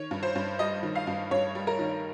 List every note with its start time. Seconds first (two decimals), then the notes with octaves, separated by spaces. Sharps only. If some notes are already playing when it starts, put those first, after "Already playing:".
Already playing: D#3 C#5
0.11 G2
0.23 C5
0.35 G2
0.59 G3 D#5
0.83 D#3
0.96 F5
1.07 G2
1.31 G2 C#5
1.55 G3
1.67 A#4
1.79 D#3